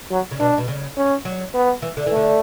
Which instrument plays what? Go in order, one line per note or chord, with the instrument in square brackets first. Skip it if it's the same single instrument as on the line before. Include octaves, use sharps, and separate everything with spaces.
[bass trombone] F#3
[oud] C#3
[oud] B2 [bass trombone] D4
[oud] B2
C#3
[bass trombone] C#4
[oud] F#3
[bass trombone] B3
[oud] E3
D3
E3
[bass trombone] A3
[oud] D3